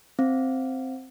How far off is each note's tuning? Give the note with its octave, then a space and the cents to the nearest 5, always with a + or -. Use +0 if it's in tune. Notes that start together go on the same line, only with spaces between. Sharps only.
C4 +0 F5 -15